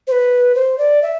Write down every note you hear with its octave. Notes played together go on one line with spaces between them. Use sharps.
C5
B4
C5
D5
E5